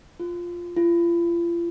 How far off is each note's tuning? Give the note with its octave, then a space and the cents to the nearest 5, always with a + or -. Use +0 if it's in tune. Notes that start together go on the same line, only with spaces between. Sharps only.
F4 +0
F4 -40